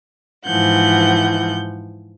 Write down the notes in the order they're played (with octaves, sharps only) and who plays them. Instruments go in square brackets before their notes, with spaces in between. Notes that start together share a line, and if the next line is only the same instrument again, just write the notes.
[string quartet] G#2 E3 F3 F#5 G6